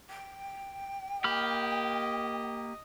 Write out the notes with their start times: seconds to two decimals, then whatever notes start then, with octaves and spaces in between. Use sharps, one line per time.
0.10 G5
1.24 A#3 G4 D#5 B5 F6